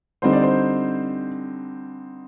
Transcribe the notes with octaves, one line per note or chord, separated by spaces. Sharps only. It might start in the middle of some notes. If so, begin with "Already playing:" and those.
D3 G3 C4 D#4 C5
D5
C5